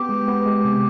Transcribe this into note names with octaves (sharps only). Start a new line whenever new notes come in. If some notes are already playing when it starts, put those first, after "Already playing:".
Already playing: B3 G4
G#3
B3
G#3
C3